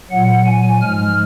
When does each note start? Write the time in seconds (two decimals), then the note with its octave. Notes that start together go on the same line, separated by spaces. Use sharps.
0.11 A#2 F#3 F#5
0.46 G#5
0.81 G#2 F3 G#3 F6